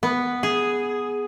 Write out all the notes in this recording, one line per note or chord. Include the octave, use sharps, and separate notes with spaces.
B3
G#4